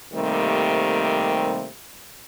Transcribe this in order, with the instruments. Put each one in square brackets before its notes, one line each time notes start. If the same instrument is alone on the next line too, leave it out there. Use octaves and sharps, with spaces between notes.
[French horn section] C3 D#3 G3 A3 A#3 C4